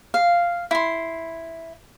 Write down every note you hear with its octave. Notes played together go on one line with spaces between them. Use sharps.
F5
E4 C6